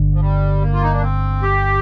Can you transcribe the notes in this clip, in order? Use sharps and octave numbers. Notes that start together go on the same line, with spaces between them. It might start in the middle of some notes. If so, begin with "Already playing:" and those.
Already playing: G1 G2 D3
F3
G3
A#3
F4
D#4
D4
C4
G4